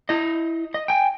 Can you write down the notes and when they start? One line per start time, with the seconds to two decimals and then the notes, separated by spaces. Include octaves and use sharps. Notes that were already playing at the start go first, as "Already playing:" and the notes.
0.09 E4 D#5
0.74 D#5
0.88 G5 G#5